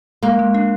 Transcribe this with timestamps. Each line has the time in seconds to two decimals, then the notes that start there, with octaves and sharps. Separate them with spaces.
0.23 G#3 A#3
0.39 G#3
0.54 D4